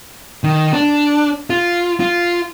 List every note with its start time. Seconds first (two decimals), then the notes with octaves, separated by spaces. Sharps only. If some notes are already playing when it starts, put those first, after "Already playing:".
0.44 D#3
0.73 D4
1.50 F4
2.00 F4